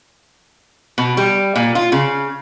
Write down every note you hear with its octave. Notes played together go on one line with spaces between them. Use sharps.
B2
G3
A#2
F4
C#3